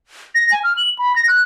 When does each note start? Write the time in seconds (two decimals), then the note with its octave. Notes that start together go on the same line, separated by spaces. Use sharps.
0.35 A#6
0.52 G#5
0.64 F6
0.77 F#7
0.99 B5
1.16 A#6
1.28 F#6